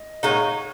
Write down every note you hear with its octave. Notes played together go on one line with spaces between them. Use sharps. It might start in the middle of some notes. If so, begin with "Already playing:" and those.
Already playing: D#5
A#2 G#3 D#4 F#4 C#5 F5